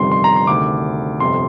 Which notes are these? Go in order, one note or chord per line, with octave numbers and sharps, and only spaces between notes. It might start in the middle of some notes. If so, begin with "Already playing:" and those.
Already playing: G1 F2 C3 D#3 G3 C6
C6
A#5
C6
D2 C3 D#3 D6
G1 F2 C3 C6